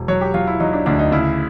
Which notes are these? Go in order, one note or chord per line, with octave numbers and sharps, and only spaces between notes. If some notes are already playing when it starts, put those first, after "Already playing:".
Already playing: E1
F#3 C#5
G4
F#3 F4
E4
F#3 D#4
D4
D2 D4
D#4
C#3 E4